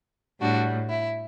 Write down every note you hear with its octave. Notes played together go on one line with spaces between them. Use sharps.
A2 G3 D4 F#4
E4